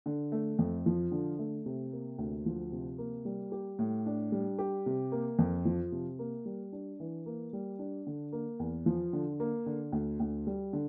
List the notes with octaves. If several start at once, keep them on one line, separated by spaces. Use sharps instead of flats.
D3
A3
F2
F3
D3
A3
C3
A#3
D2
F3
C3
A#3
G3
G4
A2
D4
G3
G4
C3
A#3
F2
F3
C3
A#3
G3
D4
E3
A#3
G3
D4
D3
A#3
E2
F3
D3
A#3
D3
D2
D2
G3
D3